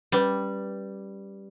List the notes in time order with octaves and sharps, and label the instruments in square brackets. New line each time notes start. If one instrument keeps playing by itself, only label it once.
[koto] G3 [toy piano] C#4 B4 D6